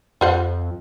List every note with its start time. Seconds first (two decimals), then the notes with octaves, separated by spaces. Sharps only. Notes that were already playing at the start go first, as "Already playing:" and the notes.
0.21 F2 F4 C5 F#5